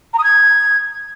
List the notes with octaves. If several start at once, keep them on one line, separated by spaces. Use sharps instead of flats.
A#5
D#6
G#6